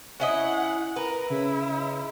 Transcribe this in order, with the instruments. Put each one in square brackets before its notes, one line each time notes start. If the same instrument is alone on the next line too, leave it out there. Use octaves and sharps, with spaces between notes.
[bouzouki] C#4 E4 D#5 [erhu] F#5
[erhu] A#4 [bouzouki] B4
[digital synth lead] C#3 [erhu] E4